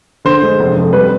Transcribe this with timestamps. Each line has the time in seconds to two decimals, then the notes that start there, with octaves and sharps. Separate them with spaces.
0.25 D3 C5
0.43 G#3
0.60 F1
0.77 F2
0.93 G3 B4